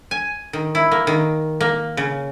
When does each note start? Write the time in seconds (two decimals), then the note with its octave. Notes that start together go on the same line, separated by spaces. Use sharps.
0.11 G#5
0.53 D#3
0.75 E4
0.92 A#3
1.07 D#3
1.61 A#3
1.97 C#3